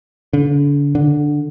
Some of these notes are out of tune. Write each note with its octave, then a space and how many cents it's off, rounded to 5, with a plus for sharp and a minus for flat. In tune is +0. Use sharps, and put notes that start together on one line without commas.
D3 -40
D3 +5